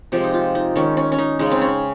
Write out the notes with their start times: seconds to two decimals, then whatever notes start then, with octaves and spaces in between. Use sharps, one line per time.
0.12 C3 F3 G#3 G4
0.24 D#4
0.34 F4
0.55 D#4
0.76 D#3 G#3 C#4
0.97 C#4
1.12 C#4
1.18 D#4
1.39 C#3 G#3 D#4
1.51 C4
1.62 C#4